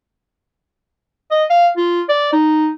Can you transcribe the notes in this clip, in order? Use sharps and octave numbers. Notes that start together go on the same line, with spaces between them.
D#5
F5
F4
D5
D#4